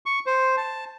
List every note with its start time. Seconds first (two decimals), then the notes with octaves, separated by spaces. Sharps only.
0.06 C#6
0.26 C5
0.57 A5